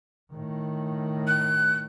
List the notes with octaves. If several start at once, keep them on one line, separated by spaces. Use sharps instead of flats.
A2 D#3
F#6